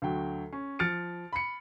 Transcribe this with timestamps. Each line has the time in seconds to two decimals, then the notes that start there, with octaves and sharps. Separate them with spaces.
0.02 D2 F#3 G5
0.52 C#4
0.79 F3 F6 A6 C#7 D7
1.33 B5 C#7